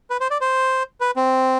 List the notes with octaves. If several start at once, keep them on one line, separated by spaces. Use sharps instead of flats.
B4
C5
D5
C5
B4
C4